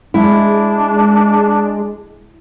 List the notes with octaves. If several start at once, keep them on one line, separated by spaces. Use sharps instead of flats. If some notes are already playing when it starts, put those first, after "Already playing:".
G#3 D4 E4